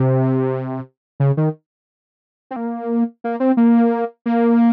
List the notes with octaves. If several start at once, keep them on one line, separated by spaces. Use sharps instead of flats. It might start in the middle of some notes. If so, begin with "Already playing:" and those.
Already playing: C3
C#3
D#3
C4
A#3
A#3
C4
A#3
A#3